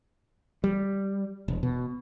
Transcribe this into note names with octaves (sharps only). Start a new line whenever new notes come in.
G3
E1
B2